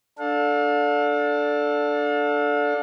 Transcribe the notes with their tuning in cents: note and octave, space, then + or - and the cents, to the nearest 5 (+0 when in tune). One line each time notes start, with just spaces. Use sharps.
D4 +0 A4 +0 F5 +40